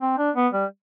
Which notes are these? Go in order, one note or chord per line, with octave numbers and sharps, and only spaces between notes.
C4
D4
B3
G3